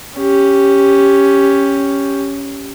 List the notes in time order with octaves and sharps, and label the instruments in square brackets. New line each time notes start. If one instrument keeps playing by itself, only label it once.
[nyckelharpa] C#4 G4